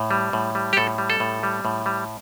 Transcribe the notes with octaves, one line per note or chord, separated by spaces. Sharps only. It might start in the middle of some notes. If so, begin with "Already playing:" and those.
Already playing: A2
G3
A2
G3
G4
A2 A4
G3
A4
A2
G3
A2
G3